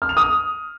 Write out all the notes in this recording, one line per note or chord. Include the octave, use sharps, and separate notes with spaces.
F6
F7
D#6